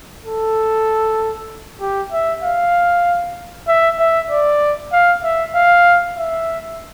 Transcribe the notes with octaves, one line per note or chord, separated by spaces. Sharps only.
A4
G4
E5
F5
E5
E5
D5
F5
E5
F5
E5